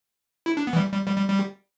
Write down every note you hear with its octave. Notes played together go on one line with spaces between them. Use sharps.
E4
D4
B3
E3
G3
G3
G3
G3
G3